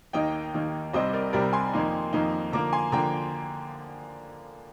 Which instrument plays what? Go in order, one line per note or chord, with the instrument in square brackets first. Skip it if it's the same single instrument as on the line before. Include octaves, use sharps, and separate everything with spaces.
[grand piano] D#2 D#3 A#3 D#4 D#5 G5
D#2 D#3 A#3 D#4
C2 C3 G3 C4 C5 D#5
A#4 D5
C2 C3 G3 C4 A#4 D5
G#5 C6
F2 D#3 A#3 D#4
F2 D#3 A#3 D#4
D3 F3 A#3 A#5 D6
G#5 C6
D3 F3 A#3 G5 A#5